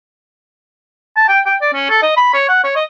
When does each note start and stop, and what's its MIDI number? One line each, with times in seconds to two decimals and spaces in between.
1.17 1.24 81
1.29 1.39 79
1.46 1.55 79
1.61 1.71 74
1.74 1.86 61
1.90 1.98 69
2.02 2.12 75
2.17 2.33 83
2.34 2.48 73
2.49 2.64 78
2.64 2.76 73
2.76 2.84 75